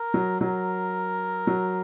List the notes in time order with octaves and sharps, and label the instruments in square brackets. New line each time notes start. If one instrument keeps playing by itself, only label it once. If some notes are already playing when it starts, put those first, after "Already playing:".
Already playing: [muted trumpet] A#4
[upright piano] F#3
[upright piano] F#3 [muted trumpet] A#4
[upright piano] F#3